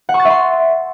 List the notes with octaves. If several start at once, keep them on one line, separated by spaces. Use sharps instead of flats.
F#5
C#6
A6
E5
C6